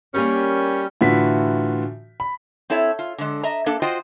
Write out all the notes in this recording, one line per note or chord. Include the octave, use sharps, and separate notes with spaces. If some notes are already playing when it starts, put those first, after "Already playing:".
G3 A#3 C#4 G4 A#4
A2 D3 E3 F4 F#4 B6
B5
C4 E4 A4 C#5 E5
F4
D3 G#3
D#5 E5 A#5
A#3 D4 A4
F4 F#4 C5 D#5 G5